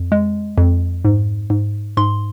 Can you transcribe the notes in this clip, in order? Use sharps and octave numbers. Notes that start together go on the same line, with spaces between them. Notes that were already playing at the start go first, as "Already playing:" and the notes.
Already playing: F2
G#3
F2
G#2
G#2
G#2 C6